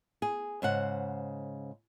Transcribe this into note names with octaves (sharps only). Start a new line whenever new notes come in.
G#4
G#2 C#3 C5 F#5